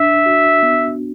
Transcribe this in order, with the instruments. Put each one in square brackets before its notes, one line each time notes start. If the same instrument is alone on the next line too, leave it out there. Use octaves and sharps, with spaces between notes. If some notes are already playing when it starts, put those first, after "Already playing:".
Already playing: [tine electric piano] D4 [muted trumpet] E5
[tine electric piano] F#4
B3